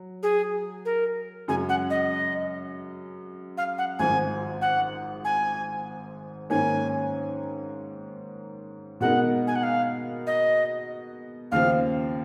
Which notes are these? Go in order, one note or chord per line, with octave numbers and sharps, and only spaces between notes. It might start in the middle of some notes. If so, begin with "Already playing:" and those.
Already playing: F#3
G#4
A#4
F#2 C#3 G#3 G#5
F#5
D#5
F5
F#5
G#1 G#2 F3 G#5
F#5
G#5
G#2 D#3 A#3 C#4 G#5
B2 G#3 B3 D#4 A#4 F#5
G#5
F#5
F5
D#5
D#2 C#3 F3 F5